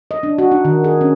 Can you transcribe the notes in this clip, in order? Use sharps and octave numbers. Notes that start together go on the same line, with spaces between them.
D#5
D4
F#4
D#4
D#3
G#4
C#4